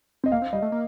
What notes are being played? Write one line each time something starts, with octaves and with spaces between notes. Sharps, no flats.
C4 D#5
A#3 F5
C4
G3 D#5
A3
A#3